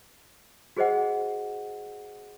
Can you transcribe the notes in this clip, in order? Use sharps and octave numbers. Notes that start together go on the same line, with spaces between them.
F#4 G#4 C5 D#5 F#5